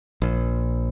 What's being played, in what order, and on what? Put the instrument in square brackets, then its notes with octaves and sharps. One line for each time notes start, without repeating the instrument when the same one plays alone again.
[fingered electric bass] A#1